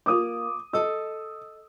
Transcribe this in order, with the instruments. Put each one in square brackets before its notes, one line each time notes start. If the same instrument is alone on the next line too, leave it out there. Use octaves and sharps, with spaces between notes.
[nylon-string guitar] A#3 F4 [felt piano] D6 D#6
[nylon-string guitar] A4 D#5 [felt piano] E6